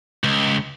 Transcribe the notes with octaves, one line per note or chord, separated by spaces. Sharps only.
C#2